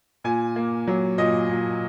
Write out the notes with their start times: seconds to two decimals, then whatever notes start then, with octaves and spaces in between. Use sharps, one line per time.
0.24 A#2 G#5
0.56 A#3
0.87 F#3
1.18 A#2 D#5
1.49 A#2